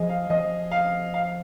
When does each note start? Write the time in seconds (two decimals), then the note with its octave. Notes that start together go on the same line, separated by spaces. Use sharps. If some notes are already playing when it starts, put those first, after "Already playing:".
Already playing: F3 G#4 D#5
0.09 F5
0.30 F3 D#5
0.71 F5
1.14 F5